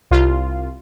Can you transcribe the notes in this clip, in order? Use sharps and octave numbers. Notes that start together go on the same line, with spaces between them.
C2 F4